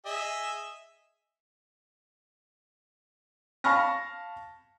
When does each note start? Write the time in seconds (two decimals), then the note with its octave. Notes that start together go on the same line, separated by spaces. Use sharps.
0.06 G#4 D#5 E5
3.64 F5 A5 B5 C#6 F6 A#6